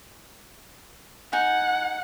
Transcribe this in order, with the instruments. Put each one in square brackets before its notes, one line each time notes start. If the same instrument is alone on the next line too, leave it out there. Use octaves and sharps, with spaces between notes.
[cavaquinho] D#4 G#5 [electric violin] F#5